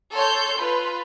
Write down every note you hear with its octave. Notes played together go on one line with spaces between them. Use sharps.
A4 C#5 C6 G6
F4 B4